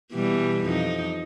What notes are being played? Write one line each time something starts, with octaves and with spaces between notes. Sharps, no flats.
B2 E3 G3
F2 D#4